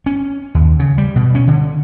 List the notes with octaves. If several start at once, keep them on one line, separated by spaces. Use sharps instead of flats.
C#4
D#2
C#3
G3
B2
C#4
D3